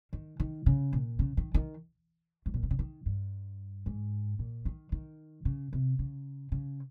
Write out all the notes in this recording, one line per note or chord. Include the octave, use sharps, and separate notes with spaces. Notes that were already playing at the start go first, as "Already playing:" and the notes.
D#3
D#3
C#3
A#2
C#3
D#3
D#3
G#2
A#2
C3
C#3
D#3
G2
G#2
A#2
D#3
D#3
C#3
C3
C#3
C#3